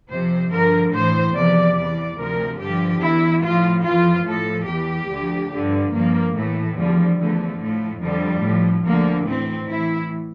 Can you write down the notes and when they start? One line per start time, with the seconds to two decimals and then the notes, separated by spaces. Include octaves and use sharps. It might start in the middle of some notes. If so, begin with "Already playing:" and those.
0.10 F2 C3 F3 C5
0.51 G2 D3 F3 A#4
0.93 A2 E3 C5
1.34 E2 C3 F3 D5
1.76 E2 E3 D5
2.18 D2 C3 F3 A#4
2.60 G2 D3 F3 G4
3.02 E2 E3 E4
3.43 A2 F3 F4
3.84 F2 E3 F4
4.26 A2 F3 A4
4.68 E2 E3 G4
5.10 D2 D3 F3
5.52 G2 D3 F3
5.93 G2 F3 A#3
6.35 A2 E3 A3
6.77 E2 D3 F3 G3
7.19 E2 D3 F3 A3
7.60 A2 F3 A3
8.02 F2 D3 F3 G3
8.44 A2 F3
8.85 D2 D3 F3 A#3
9.27 A2 E3 C4
9.68 A2 E3 E4